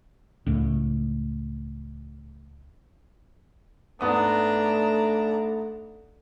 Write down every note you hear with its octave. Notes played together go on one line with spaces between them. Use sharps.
C#2 A2
G#2 A3 B3 D4 A#5 D#6